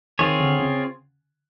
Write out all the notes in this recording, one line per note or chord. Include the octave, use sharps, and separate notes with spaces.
D#3 C4 F4 G#4 C#5
D3
C#3